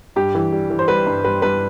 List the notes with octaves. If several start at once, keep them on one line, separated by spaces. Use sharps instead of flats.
G2 G4
E3
G3
E3
C5
G3 B4
G2
G3 B4
G2 B4